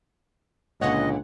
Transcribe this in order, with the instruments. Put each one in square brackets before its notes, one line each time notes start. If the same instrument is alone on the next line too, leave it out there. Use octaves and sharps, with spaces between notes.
[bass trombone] C#2 [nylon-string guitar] A#2 D3 [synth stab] C#5 F#5 [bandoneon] D#5